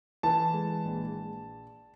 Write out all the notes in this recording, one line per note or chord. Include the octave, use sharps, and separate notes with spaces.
E3 A5
G#3
A#1